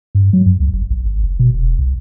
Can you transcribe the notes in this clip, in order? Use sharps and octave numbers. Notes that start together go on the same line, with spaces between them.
G2
F#3
F#2
C#2
G1
A#1
G#1
F#1
B2
E1
C2